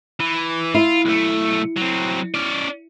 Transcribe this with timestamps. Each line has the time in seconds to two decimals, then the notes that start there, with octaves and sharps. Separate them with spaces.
0.20 E3
0.74 E4 F4
1.05 B1 A3
1.77 F#3 C4
2.35 C#4 D5